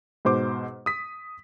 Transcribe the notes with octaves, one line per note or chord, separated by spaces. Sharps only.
G#2 B2 C5 D6
D#6 B6